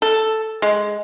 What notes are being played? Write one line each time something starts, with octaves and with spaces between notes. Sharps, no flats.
A4
G#3